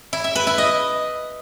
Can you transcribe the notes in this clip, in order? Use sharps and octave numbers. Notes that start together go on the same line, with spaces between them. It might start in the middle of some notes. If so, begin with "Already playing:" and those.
E4
E5
B4
E4
D#5